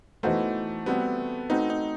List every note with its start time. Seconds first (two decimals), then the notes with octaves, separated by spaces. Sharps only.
0.23 E3 A3 B3 D#4 F#4 C5
0.86 G3 B3 C4 F#4
1.50 A3 C4 D#4 F#4 B4
1.70 D#4